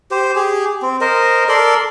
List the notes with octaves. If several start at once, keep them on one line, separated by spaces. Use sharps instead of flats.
G4 C5
G4 G#4
C4
A#4 C5 D#5
A4 A#4 D5 C6